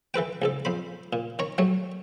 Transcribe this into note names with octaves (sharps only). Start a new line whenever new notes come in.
E3 A4 B4 G5
C#2 G#2 A4
F2 C5 B5
A#2
D#3 C#5 A#5
F#3 G3 A3 C#5